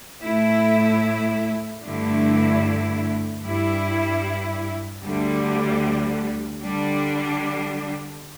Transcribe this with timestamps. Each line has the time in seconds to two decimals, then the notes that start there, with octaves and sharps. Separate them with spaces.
0.23 A2 A3 E4
1.83 G2 D3 A3 E4
3.43 G2 G3 E4
5.03 D2 D3 G3
6.63 D3 G3 D4